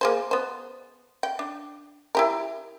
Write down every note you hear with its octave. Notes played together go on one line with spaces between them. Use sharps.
A#3 G#4 C5
B3 C5
G5
D4
E4 G4 A#4